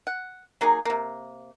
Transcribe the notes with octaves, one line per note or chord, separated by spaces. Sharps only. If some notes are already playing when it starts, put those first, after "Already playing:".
F#5
F#3 A#3 D#4 G#4
C3 A#3